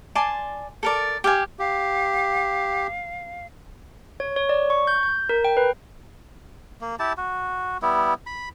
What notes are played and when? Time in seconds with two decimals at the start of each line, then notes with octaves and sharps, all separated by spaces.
0.15 D5 G#5 A5 C6
0.83 A4 A#4 D5
1.24 G4 F5 G#5
1.59 G4 F5
4.20 C#5
4.36 C#5
4.49 D5
4.70 C#6
4.87 G6
5.03 G6
5.29 A#4
5.44 G5
5.57 B4
6.81 A#3
6.99 E4 G4 A5
7.18 F#4
7.82 G3 B3 E4
8.26 B5